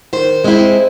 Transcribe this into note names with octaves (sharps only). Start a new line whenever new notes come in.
D#3 C5
G#3 C4 E4